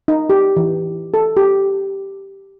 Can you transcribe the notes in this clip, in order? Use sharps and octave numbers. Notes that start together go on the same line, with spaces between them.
D#4
G4
E3
A4
G4